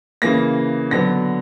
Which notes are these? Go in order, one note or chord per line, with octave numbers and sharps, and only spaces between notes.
C#3 E3 A#3 A#6
D3 F#3 B3 A#6